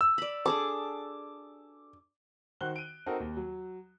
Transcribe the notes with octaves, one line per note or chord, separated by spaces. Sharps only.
E6
D5 B5
D4 G#4 A4 D6
D#3 F#4 C5 F#6 G7
D7 D#7
C4 D#4 F#4 A4 A#4
D#2
F#3